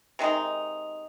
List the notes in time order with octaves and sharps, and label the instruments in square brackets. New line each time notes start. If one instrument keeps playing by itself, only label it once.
[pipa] C3 D#3 G#3 D#4